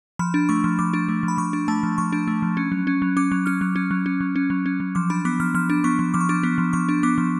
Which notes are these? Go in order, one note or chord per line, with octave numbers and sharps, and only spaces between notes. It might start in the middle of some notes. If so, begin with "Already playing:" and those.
F3 B5
D4
A3 C#6
F3
F3 D6
D4
A3
F3
B5
F3 C#6
D4
A3 A5
F3
F3 C#6
D4
A3
F3
C#4
F#3
C#4
F#3
C#4 D6
F#3
C#4 F6
F#3
C#4
F#3
C#4
F#3
C#4
F#3
C#4
F#3
F3 D6
D4 B5
B3 D6
F3 F6
F3 F6
D4
B3 C#6
F3
F3 D6
C#6
D4 D6
B3
F3
F3 C#6
D4
B3 D6
F3